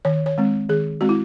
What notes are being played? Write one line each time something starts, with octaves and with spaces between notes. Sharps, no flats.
D#3 C#5
C#5
G#3 C4
D#3 G#4
G#3 C4 F#4
E4